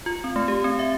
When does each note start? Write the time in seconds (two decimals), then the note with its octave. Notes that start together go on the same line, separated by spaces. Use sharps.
0.06 F4
0.24 C4
0.36 A3
0.48 G4
0.64 C4
0.79 E5